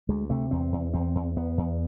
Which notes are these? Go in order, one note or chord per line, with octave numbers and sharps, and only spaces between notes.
D2 G#3
C3 A3
E2 C4
E2
E2 C4
E2
E2 B3
E2